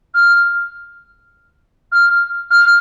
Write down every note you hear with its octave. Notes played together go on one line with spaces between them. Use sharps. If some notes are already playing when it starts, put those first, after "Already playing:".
F6
F6
F6